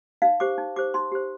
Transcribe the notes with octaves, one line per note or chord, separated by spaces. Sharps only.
D#4 F5
G4 C5 D6
D#4
G4 C5 D6
D#4 C6
G4 C5